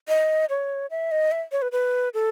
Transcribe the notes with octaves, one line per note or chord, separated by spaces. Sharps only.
D#5
C#5
E5
D#5
E5
C#5
B4
B4
A4